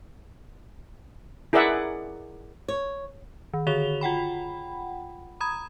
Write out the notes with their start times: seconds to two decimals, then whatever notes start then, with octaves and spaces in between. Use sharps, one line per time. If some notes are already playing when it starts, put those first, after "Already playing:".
1.53 E4 G#4 A#4 D5 E5 F#5
2.68 C#5
3.54 D#3
3.67 D3 F#4 G#4 C#5 F7 G7
4.01 F4 F#5 G5 B5
5.40 A#5 B5 D#6 G#6